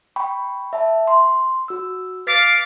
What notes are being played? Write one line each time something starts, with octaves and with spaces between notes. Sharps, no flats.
G5 B5 C#6
E5 A5
C6
F#4 E6
B4 F5 D6 A6 B6